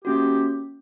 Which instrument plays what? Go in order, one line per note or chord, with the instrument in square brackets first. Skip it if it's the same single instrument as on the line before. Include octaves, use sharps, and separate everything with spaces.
[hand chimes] A#3 C#4 F#4 [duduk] G4